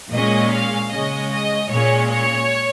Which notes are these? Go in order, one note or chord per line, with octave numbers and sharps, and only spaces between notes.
A#2 G#3 C#4 D#5
F5
C#3 G#3 C#4 D#5
D#5
A#2 G#3 C#4 C#5
C#5